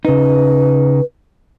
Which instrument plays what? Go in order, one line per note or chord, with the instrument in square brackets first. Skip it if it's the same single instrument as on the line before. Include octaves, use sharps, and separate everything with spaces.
[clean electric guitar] C#3 D#4 [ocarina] B4